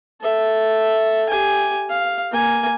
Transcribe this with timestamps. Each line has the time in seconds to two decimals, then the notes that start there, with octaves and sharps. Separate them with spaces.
0.21 A4 E5
1.29 G4 G#5
1.90 F5
2.31 A#3 G#5